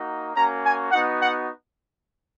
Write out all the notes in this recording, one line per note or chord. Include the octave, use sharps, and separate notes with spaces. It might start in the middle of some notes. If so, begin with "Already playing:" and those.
Already playing: A#3 D#4 F#4
A#3 C#4 F#4 A#5
G#5
B3 D#4 F#4 F#5
F#5